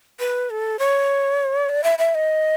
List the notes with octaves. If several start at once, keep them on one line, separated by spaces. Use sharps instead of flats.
B4
A4
C#5
D5
E5
E5
D#5